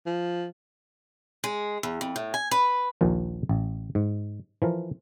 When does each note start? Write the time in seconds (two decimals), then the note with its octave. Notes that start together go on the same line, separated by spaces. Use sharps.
0.06 F3
1.44 G#3
1.83 E2
2.01 F2
2.16 A2
2.34 G#5
2.51 B4
3.01 A#1 D#2 A#2 F3
3.49 A1
3.95 G#2
4.62 E3 F3 A#4